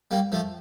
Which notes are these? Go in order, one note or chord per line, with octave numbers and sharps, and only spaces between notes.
G3 A#3
F3 A3